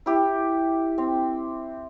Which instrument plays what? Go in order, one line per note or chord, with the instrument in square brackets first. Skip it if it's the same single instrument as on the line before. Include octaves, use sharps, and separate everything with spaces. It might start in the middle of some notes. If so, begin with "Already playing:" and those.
[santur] E4 G4
C4